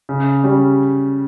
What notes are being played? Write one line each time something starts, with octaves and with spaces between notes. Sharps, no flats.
C#3
G3 C#4